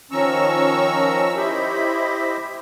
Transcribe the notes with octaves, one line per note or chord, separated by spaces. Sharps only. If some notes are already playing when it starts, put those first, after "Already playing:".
D#3 F3 C#4 A#5 C#6 E6
E4 G4 C5 D#5 E5 B5